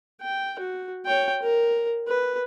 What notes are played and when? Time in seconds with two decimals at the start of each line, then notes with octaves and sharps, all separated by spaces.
0.22 G5
0.59 F#4
1.06 C#5 G5
1.42 A#4
2.08 B4